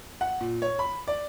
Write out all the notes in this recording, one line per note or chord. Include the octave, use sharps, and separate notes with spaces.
F#5
A#2
C#5
B5
D5